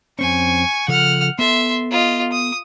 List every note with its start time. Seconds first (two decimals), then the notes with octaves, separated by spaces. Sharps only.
0.19 F2 C4 C#4 G#5 C#6
0.88 C#3 F3 A4 F#5 F6
1.39 B3 A4 E5 C6
1.91 F4 D#5
2.32 D#6